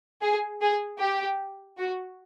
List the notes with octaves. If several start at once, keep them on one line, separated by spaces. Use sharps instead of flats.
G#4
G#4
G4
F#4